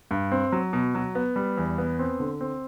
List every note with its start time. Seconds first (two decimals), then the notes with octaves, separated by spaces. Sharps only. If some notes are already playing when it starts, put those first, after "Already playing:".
0.11 G2
0.31 C4
0.52 F#3
0.73 B2
0.95 F#3
1.15 B3
1.36 G3
1.57 E2
1.78 B3
1.99 C4
2.20 D3
2.41 C4